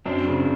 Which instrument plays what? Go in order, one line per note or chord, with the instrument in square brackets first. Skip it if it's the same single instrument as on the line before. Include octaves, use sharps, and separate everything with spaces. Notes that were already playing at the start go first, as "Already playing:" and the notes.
[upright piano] F#2 [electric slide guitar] C4 D4
[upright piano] C#3